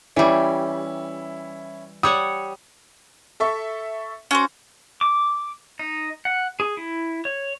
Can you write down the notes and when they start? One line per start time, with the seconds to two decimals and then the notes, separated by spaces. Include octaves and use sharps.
0.16 E3 G3 C#4 E4
2.03 G3 C#5 F#5 D#6
3.40 A4 E5 C#6
4.31 C#4 F#4 C5
5.01 D6
5.79 D#4
6.25 F#5
6.60 G#4
6.77 E4
7.25 C#5